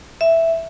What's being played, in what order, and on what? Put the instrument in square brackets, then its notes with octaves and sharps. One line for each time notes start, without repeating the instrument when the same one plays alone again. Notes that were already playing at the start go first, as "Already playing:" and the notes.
[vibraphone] E5